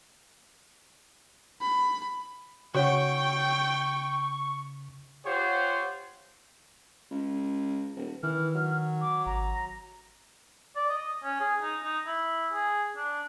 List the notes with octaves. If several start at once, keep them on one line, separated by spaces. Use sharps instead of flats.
B5
C#3 F#4 C#5 F#5 G5 C#6
F4 G4 C5 C#5 F#5
C#2
D#1
D#3 E3 F6
F#3
D6
G#1 A#5
D5
D#5
C#4
G#4
D#4
D#4
E4
G#4
D4